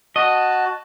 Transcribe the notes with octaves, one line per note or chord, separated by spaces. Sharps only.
F#4 D#5 A5